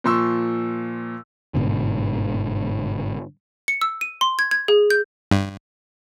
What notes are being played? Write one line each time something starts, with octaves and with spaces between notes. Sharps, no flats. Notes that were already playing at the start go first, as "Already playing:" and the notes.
A#2 F3 C6 C#6 E6
G1 G#2 B2 D3
C#7
E6
D#7
C6
G#6
G#6
G#4
G6
G2